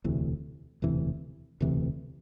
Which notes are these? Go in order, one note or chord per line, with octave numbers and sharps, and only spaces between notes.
E1 D2 C3 E3
E1 D2 C3 E3
E1 D2 C3 E3